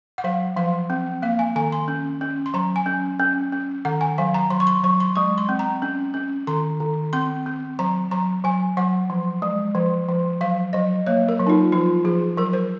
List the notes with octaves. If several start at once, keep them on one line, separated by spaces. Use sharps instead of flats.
F#5
F#3 F5
F3 F5
C4
A#3 F5
G#5
D#3 G#5
C6
C#4
C#4
C6
F#3 A#5
G#5
C#4
C#4
C#4
D#3 F#5
G#5
F#3 F5
A#5
F#3 C6
C#6
C6
F#3 C#6
C6
G#3 C#6
C6
C4
A#5
C#4
C#4
D#3 C6
D#3
C4 C6
C4
F#3 A#5
F#3 A#5
F#3 G#5
F#3 F#5
F3
G#3
F3
F3
F#3 F5
F#3 D#5
A#3 C#5
A#4
F#3
D#4
F4
F3 F4
F3 G#4
F#3 A#4
C5